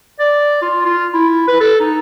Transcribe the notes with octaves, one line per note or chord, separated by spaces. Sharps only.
D5
F4
F4
E4
B4
A4
D#4